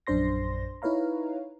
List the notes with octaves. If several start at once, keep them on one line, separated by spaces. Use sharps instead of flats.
A#1 F#2 D4 C5 C6 A#6
D#4 E4 B4 C#5 F5 A#5